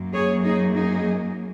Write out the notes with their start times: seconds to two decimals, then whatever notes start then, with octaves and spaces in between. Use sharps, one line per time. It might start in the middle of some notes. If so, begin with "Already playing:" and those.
Already playing: F#2 F#3 A#3
0.14 G#4 C#5
0.44 D#4 G#4
0.74 D#4 G#4